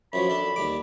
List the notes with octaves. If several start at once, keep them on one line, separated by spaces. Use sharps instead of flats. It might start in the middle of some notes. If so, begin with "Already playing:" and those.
F#2 F3 F#3 B5
D4 A4
D#2 G3 D6